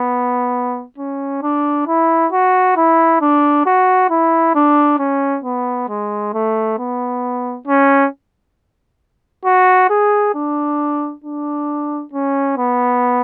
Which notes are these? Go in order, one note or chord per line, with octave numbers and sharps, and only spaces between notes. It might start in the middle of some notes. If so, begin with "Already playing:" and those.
Already playing: B3
C#4
D4
E4
F#4
E4
D4
F#4
E4
D4
C#4
B3
G#3
A3
B3
C#4
F#4
G#4
D4
D4
C#4
B3